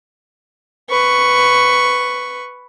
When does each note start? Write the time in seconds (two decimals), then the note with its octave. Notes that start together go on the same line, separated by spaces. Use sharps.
0.90 B4 C#6